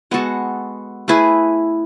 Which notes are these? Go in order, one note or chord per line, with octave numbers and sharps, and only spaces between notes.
G#3 B3 F#4 A4
A3 E4 G#4 B4